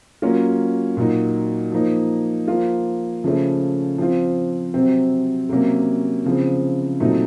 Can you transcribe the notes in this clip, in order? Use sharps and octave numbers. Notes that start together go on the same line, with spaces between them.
F#3 A#3 C#4 F4
A#2 F#3 A#3 D#4 F#4
F3 A#3 D#4
F3 A#3 F4
C#3 F3 A3 C#4
F3 C4 F4
C3 F#3 C4
C3 F#3 A#3 C#4
C#3 F3 C4
A#2 F#3 A3 C4 D#4